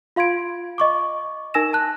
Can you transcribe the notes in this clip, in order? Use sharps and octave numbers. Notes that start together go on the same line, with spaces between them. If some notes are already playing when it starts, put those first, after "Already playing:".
F4 F5 C6 G#6 D7
D#5 C#6 D6
D#4 A#4 G#5 E6 A#6 E7
A5 F#6